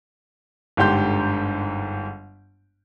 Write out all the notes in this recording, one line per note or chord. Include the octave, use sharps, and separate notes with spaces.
G1 G#2 D3 G4 C6 G6